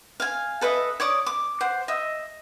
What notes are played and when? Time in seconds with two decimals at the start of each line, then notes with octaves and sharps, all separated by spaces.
0.20 F5 G#5
0.61 A4 B4 D#5 E5
1.00 C#5 D5 D6 D#6
1.27 D6
1.61 C5 F#5
1.88 D#5 E5